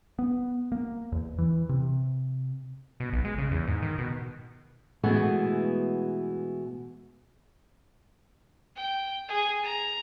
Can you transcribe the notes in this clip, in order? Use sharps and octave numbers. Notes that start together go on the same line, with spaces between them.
B3
A#3
E2
E3
C3
B2
B1
G#3
C#3
E2
G#2
D#3
B2
B2 E3 G#3 A3 B3
G5
G#4
A#5